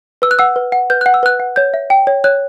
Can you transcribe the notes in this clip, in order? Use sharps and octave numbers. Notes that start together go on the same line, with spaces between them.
B4 E6
F#6
F#5 E6
B4
F#5
B4 G6
F#5 F#6
E6
B4 F#6
F#5
C#5 G6
E5
G5
C#5
C#5 F#6